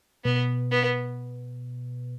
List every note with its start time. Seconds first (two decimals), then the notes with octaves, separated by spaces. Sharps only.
0.24 B2 B3
0.71 B3